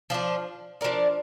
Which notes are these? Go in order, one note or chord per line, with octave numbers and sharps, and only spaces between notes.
F3 D4 F4
F3 D4 A#4 D5